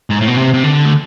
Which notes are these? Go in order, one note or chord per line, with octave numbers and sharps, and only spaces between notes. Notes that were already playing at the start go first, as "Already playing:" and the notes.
G#2
A2
B2
C3
C3
D3
A3